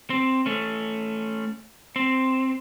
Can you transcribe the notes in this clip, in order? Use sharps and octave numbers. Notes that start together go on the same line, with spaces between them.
C4
A3 C#4
C4